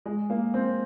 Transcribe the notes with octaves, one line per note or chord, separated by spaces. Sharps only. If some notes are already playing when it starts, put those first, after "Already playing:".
G#3
A#3
C4